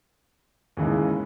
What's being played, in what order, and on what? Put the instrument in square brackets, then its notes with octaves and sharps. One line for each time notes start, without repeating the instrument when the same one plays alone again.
[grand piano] D#2 C#3 E3 G#3